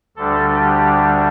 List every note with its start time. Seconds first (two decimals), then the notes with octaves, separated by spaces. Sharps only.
0.16 D2 D3 G3 D4 A4
0.60 G4